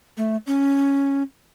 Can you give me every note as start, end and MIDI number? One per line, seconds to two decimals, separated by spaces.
0.17 0.37 57
0.47 1.23 61